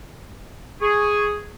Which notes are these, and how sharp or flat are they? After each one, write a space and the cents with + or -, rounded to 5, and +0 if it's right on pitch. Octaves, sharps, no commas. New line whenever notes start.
G#4 +0 C#6 +0